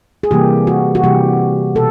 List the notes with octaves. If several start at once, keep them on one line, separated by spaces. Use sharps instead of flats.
G#4
C3 E3 G3 A#3 G4
F#4
F#4
C3 E3 G3 A#3 G4
B2 A4